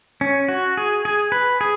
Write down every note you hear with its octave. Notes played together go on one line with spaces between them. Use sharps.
C#4
F#4
G#4
G#4
B4
G#4